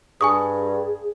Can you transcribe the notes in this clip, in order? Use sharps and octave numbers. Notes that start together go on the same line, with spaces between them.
G2 G#4 G#5 C#6 D#6